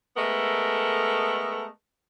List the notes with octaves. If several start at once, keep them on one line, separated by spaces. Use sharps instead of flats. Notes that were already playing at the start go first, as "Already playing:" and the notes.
G#3 A3 B3 A4 A#4